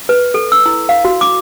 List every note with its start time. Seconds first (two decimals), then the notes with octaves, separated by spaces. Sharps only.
0.09 B4
0.34 A4
0.52 E6
0.66 E4
0.89 F5
1.05 F#4
1.21 D6